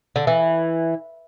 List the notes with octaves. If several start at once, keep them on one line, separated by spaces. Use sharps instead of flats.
D3
E3